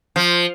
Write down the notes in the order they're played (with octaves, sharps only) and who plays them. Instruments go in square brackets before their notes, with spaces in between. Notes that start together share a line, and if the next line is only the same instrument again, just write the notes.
[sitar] F3